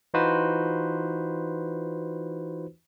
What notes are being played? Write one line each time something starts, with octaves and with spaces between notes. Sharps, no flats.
E3 D#4 F4 F#4 B4 C5